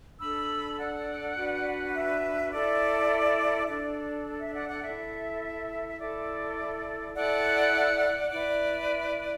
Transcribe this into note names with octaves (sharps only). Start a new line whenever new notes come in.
D4 A4 B5 E6
D5 F#5
D4 F#4 B4
E5
E4 A4 D5
D4 A4 D5
E5
D5 F#5
D5 F#5
E4 A4 E5
E5
E4 A4 D5
E4 A4 D5 F#5
E4 B4 D5